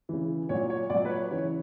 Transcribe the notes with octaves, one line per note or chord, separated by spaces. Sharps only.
C#3 E3
A#2 F#3 C#5
C#5
A#2 F#3 D5
B4
C#5
C#3 E3 C#5